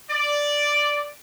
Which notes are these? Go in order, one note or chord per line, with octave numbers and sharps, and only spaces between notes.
D5